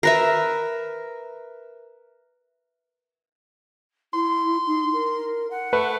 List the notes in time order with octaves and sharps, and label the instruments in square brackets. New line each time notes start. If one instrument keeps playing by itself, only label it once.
[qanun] A#4 B4 E5
[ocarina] E4 [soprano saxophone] C6
[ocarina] D#4
A#4
F#5
[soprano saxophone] A3 [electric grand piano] B4